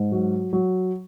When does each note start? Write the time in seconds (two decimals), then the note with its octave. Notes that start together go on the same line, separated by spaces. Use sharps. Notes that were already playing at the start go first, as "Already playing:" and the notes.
Already playing: G#2
0.12 F#3
0.53 F#3